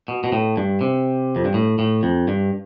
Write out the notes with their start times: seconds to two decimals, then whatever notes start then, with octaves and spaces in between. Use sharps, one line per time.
0.08 B2
0.24 B2
0.33 A2
0.57 G2
0.81 C3
1.36 F2
1.45 G2
1.54 A2
1.79 A2
2.03 F2
2.28 G2